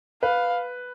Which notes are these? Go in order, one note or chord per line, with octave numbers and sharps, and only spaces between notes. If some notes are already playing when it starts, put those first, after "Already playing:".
B4 F5